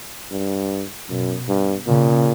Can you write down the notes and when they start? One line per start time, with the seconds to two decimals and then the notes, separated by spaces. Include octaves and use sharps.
0.31 G2
1.09 F#2 B2
1.49 G2
1.87 A#2 C#3